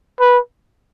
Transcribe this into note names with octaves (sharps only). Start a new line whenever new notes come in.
B4